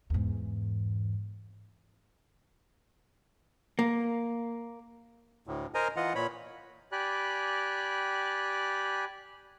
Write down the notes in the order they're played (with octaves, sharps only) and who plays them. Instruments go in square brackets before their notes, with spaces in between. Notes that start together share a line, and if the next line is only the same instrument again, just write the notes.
[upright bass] E2 G#2
[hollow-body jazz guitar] A#3
[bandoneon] D2 A2
A#4 C5 D#5 G#5 A#5
E3 F4 D#5 F#5
A#2 C#5 B5
[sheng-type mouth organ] G4 D5 G#5 B5 F#6